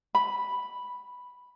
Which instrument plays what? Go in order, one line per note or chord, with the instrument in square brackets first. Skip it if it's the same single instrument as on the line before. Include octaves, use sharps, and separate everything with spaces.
[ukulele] B5